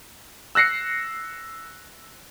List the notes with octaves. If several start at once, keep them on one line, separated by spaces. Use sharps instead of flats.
E6 F#6 A#6 C7 C#7